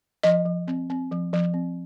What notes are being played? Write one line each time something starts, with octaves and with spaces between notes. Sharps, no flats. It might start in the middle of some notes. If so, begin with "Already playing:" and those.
F3 D#5
F3
C4
C4
F3
F3
C4